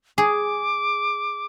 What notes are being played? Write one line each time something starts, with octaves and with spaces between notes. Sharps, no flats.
G#4 D6